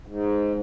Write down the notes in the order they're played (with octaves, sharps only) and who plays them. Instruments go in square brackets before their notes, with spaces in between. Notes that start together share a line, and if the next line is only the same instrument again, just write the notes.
[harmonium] G#2